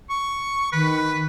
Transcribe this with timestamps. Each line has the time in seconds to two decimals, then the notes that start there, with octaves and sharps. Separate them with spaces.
0.10 C#6
0.73 D#3 B4